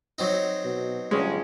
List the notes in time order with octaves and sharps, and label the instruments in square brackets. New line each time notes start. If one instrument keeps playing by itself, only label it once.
[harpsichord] F#3 C4 D#4
[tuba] B2
[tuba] G1 [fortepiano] G#3 C#4